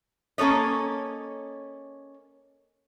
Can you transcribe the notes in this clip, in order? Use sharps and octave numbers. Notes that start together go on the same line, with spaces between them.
A#3 C#4 A4 C#5 D#5